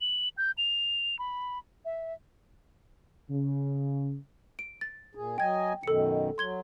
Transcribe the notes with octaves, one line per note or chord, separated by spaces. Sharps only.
F#7
G6
F7
B5
E5
C#3
D7
A6
A#2 G#4
F#3 D#5 G5 G#5 G#6
F#2 B2 D#3 A4 C#7
F#3 C6 G#6 G7